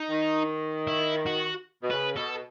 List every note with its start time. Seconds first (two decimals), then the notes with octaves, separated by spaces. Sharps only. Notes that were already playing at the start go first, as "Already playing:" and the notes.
Already playing: D#4
0.10 D#3
0.88 E4
1.26 F#4
1.83 B2
1.90 C#3 B4
2.16 B2 A4